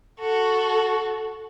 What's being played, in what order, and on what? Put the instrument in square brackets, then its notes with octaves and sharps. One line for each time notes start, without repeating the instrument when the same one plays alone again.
[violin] F#4 A4